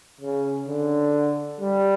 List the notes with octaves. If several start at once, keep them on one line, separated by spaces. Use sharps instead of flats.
C#3
D3
G3